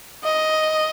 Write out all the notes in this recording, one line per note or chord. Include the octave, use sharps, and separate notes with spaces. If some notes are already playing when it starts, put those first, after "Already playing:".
D#5